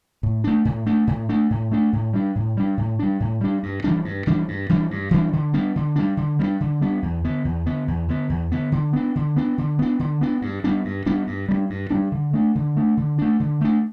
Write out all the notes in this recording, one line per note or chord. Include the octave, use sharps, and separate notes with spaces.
A2
A3 D4
A2
A3 D4
A2
A3 D4
A2
A3 D4
A2
G3 D4
A2
G3 D4
A2
G3 D4
A2
G3 D4
G2
E3 G3 D4
G2
E3 G3 D4
G2
E3 G3 D4
G2
E3 G3 D4
D3
G3 B3 D4
D3
G3 B3 D4
D3
G3 B3 D4
D3
G3 B3 D4
E2
D3 B3
E2
D3 B3
E2
D3 B3
E2
D3 B3
D3
B3 D4
D3
B3 D4
D3
B3 D4
D3
B3 D4
G2
G3 B3 D4
G2
G3 B3 D4
G2
G3 B3 D4
G2
G3 B3 D4
D3
A3 D4
D3
A3 D4
D3
A3 D4
D3
A3 D4